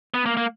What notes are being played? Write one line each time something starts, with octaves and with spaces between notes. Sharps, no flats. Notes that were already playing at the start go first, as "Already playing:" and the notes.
B3
A#3
A#3